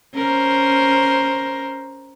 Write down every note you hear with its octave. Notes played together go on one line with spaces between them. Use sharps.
C#4 A#4 C5